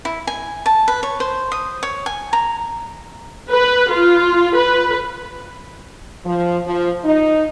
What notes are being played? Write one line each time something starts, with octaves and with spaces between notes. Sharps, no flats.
E4
G#5
A5
B4
C#5
C5
D#6
C#5
G#5
A#5
B4
F4
B4
F3
F3
D#4